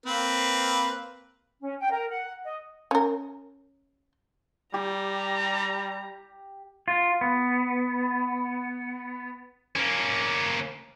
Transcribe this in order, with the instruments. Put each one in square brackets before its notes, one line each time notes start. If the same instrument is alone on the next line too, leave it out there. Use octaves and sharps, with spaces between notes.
[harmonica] A#3 C4 B4
[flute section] C#4
G5
A#4
F#5
D#5
[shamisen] C#4 A#4
[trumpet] G3 [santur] G4 [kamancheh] A#5
[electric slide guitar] F4
B3
[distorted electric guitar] A#3 C#4